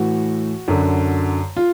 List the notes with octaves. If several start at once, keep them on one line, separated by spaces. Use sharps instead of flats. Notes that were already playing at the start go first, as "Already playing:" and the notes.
Already playing: A2 E3 F#4
F#2 D3
F4